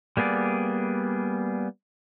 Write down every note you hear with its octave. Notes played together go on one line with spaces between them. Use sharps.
G3 A#3 B3 G#4 D5